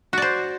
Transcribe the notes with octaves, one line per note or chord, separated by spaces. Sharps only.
F#4 C5 D5